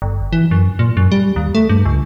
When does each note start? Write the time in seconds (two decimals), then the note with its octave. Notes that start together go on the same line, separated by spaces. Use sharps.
0.02 G1
0.33 E3
0.51 F#2
0.79 A#2
0.97 F#2
1.12 G3
1.36 D#2
1.55 A3
1.69 G2
1.85 C#2